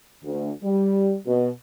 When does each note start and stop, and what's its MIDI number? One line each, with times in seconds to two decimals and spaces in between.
0.24 0.51 38
0.63 1.16 55
1.27 1.49 47